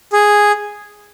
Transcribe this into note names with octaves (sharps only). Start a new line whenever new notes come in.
G#4